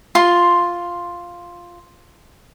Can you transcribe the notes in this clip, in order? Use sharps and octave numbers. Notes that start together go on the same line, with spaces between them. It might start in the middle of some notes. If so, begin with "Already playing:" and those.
F4 C6